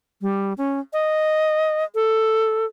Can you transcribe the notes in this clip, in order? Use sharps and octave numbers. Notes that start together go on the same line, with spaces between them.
G3
C#4
D#5
A4